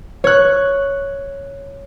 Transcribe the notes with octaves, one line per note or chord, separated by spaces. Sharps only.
C#5 F#6